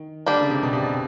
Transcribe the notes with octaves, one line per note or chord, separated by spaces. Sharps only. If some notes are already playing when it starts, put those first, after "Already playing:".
Already playing: D#3
D3 G3 A#3 D4 G4
C#3
C3
B2
C3
B2